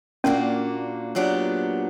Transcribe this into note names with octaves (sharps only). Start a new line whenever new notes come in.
A#2 A#3 C#4 D4 F#4
A#2 F#3 B3 D4 G4